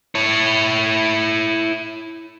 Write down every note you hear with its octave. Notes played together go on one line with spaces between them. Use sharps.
E4 C#5